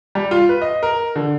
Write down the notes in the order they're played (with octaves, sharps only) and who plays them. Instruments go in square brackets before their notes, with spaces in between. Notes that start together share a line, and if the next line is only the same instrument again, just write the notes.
[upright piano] G3
F4
B4
D#5
A#4
D3